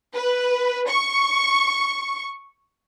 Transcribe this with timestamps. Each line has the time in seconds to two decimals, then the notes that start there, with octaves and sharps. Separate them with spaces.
0.14 B4
0.89 C#6